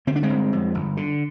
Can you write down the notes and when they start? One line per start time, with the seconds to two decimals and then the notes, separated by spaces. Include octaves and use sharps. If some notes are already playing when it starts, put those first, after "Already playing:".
0.07 D3 C4
0.16 D4
0.23 G#3 C4
0.30 G1
0.53 F2
0.75 G1
0.97 D3